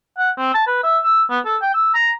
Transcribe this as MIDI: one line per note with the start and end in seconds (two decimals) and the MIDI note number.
0.18 0.30 78
0.38 0.53 60
0.54 0.64 81
0.67 0.82 71
0.83 0.98 76
1.04 1.23 88
1.30 1.39 59
1.45 1.57 69
1.62 1.73 79
1.74 1.94 88
1.94 2.11 82